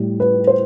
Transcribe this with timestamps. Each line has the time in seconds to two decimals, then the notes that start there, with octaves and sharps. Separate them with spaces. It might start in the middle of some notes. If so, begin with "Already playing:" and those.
Already playing: A2 G3
0.20 B4
0.47 C5